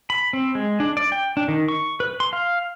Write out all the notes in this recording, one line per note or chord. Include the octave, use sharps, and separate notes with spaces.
B5
C4
G#3
D4
D5
G5
D4
D#3
C#6
B4
C6
F5